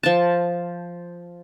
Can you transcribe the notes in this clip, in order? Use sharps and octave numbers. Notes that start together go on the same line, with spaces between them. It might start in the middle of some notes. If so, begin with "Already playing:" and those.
F3 A5